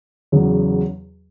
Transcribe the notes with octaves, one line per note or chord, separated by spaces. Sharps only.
E2 C#3 F#3